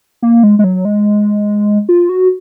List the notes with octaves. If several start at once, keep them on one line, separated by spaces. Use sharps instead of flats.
A#3
G#3
G#3
F#3
G#3
F4
F#4